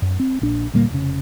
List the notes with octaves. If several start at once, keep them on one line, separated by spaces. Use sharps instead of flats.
F#2
C4
A#1 D4
D2 A#2 G3 A#3
F1 C#3